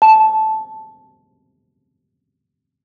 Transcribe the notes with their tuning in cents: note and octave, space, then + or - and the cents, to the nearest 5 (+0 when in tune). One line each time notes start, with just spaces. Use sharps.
A5 -10